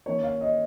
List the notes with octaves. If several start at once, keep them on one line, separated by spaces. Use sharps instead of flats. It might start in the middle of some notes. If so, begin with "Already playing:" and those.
D#3 A#3 C#4 C#5
F5
D#5